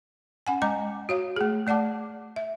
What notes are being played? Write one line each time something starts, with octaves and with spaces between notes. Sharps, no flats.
C#4 F#5 G#5
G#3 D#5 A#5 D6
F#4 C#5 F5
A3 G#4
A3 D5 F#5 A5 D6
E5